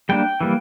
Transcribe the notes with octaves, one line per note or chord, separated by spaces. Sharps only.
G3 A#3 D4 G5
E3 G3 A#3